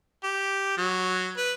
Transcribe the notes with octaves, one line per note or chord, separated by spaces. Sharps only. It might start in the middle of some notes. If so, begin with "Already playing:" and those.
G4
F#3
B4